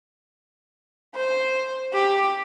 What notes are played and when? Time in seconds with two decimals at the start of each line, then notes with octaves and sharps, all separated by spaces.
1.15 C5
1.93 G4